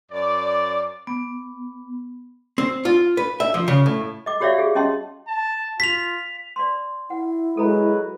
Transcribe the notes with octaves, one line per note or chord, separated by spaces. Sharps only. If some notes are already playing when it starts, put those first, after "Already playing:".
F#2 D5
B3
C4
F4
B4
E5
F3
C#3
A2
D#5 D6
F#4 G4 C#5 D5 E5 F5
G4 G#4
C#4 D#5 A5 C6
A5
F4 B6 F7
D5 C6
E4 F#5
F#3 G#3 A4 B4 A#5